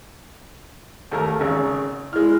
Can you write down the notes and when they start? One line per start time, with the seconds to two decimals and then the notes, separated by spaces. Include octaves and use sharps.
1.12 D#2 A3 A#4
1.40 G#1 C#3
2.13 G#3 E4 F6